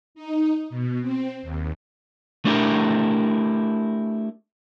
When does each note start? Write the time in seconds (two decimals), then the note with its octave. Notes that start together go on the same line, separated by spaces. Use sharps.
0.15 D#4
0.70 B2
1.01 C4
1.42 D#2
2.45 A3 D4 E4 G4 A#4